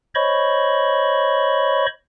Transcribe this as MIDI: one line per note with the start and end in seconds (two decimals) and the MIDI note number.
0.15 1.86 72
0.15 1.86 73
0.15 1.86 75
0.15 1.86 83
0.15 1.86 85